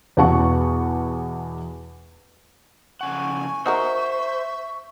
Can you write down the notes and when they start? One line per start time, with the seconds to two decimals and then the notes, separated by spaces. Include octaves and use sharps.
0.17 E2 B2 B3 F#5 A5 C#6
3.01 F2 C#3 F#5 G#5 C#6
3.66 D#4 F#4 A#4 C5 E5